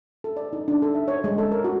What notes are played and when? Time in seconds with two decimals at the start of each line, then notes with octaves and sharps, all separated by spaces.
0.24 A4
0.37 D5
0.53 D#4
0.68 D4
0.82 A4
0.95 E5
1.08 C#5
1.24 G#3
1.38 A4
1.52 A#4
1.64 F#4